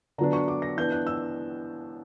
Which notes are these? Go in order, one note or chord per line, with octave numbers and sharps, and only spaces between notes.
D3 F#3 B3 D4 A#5
C#6
D6
A#6
E3 B3 D4 G6
F#6
E6